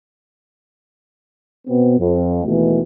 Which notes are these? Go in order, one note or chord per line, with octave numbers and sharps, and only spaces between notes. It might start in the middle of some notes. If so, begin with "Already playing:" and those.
B2 B3 C4
F2
D#2 B2 D#3 E3 A3